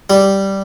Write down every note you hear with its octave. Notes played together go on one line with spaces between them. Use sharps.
G3